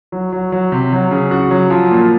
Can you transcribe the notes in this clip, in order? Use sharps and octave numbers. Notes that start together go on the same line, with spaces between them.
F#3
F#3
F#3
C3
F#3
C#3
F#4
F#3
F3
A#2